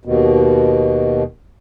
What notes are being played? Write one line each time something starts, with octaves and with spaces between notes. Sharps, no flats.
D#2 B2